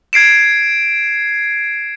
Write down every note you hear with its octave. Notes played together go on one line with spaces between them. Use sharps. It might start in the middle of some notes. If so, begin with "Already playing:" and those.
G#6 C7 D7 E7